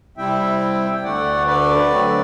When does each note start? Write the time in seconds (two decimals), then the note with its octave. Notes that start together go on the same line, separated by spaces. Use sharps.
0.17 C3 G3 C4 E4 E5 G5
0.94 G5
1.04 D2 D3 A3 D5 F#5
1.47 B4 D5
1.90 D3 F#3 A3 C4